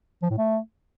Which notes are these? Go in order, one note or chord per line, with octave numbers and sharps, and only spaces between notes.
F3
A2
A3